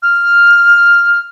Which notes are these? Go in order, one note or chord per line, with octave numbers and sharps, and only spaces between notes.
F6